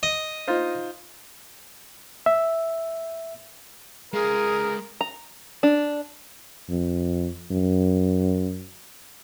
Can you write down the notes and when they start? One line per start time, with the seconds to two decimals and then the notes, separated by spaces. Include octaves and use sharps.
0.03 D#5
0.48 D#4 F4 C5
2.26 E5
4.13 G#3 G#4 A#4 F5
5.01 A#5
5.63 D4
6.69 F2
7.51 F#2